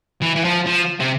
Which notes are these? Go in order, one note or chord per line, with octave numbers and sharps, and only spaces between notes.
E3
E3
F3
F3
C3